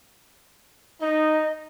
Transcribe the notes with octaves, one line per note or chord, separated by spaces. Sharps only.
D#4 D#5